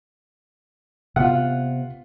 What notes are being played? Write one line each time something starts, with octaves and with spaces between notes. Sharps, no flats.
C3 B3 F4 F#5